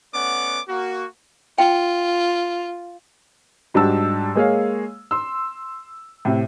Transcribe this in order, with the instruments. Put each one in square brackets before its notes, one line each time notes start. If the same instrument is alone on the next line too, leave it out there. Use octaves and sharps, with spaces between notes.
[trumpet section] A3 B3 C#4 D5 F#5 D6
A#3 F#4
[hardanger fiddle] F4 [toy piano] G5
[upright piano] G#2 G3 D4 F#4 A5 E6
G#3 A#3 G#4 C#5 F5
C6 E6
A2 C3